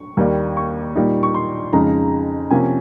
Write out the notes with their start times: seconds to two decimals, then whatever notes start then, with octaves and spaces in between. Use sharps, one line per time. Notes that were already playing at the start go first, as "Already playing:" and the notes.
Already playing: C#6
0.17 D#2 D#3 G3 A#3
0.57 C#6
0.95 A#2 G3 A#3 D#4
1.23 C#6
1.34 C6
1.73 F2 C#3 G#3 D#4 A#5
2.50 C3 F3 A#3 C#4 G#5